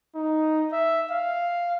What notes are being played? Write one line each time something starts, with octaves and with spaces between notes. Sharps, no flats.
D#4
E5
F5